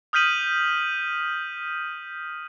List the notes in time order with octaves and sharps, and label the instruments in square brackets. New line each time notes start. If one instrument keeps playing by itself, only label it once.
[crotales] D#6 F6 G6 B6 D#7 F#7